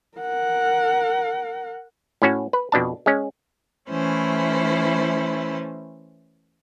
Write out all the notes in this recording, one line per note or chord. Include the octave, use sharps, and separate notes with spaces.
A#4 F#5
A2 C#4 F#4
B4
F2 B2 D4 A5
G#3 C#4
E3 A3 C#4 E4 C5